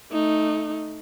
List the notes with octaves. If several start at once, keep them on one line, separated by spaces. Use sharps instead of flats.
A3 D#4